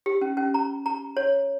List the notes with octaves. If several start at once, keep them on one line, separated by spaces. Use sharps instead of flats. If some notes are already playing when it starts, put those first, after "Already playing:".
G4
C#4
C#4
A#5
A#5
C#5